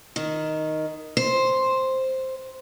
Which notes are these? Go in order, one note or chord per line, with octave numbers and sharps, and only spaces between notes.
D#3
C5